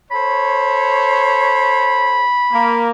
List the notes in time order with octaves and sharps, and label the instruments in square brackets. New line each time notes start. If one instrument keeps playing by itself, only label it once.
[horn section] A4 C5 C#5 [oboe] B5
[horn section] A#3